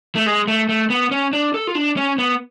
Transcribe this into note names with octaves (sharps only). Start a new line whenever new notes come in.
A3
G#3
A3
A3
B3
C#4
D4
A4
F4
D4
C#4
B3